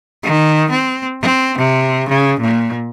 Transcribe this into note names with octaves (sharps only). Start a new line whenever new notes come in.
D#3
C4
C4
C3
C#3
A#2